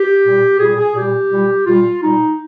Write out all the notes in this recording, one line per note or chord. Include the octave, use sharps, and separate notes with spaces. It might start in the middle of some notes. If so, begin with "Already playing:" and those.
Already playing: G4
A#2 G3
A#2 G3 G#4
G#4
A#2 G3 G4
A#2 G3
A#2 G3 F4
A#2 G3 D#4